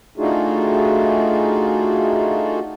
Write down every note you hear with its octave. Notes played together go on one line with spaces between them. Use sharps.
A3 D4 D#4 F4 F#4 G#4